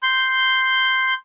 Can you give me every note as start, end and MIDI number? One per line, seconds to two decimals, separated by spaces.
0.03 1.13 84
0.03 1.13 91